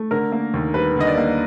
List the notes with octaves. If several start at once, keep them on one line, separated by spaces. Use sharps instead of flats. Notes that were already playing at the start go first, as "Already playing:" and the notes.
Already playing: A3
D3 A#4
A#3
D#2
G3 B4
D3 D#5
D5
A#3